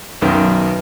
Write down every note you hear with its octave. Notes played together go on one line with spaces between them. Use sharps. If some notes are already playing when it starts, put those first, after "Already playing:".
B1 F#2 D#3 B3